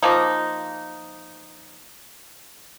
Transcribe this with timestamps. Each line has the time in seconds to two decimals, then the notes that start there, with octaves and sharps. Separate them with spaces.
0.03 F3 A#3 D#4